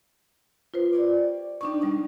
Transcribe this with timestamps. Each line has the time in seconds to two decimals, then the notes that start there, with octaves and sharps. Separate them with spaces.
0.74 F4 B4 C5
0.93 G3 C#5 D5
1.61 D#3 G3 D4 D#4 B4 C#6
1.81 B2 G3 A#3 C#4 D#4